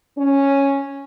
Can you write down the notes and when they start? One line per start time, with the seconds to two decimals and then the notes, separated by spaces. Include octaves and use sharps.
0.18 C#4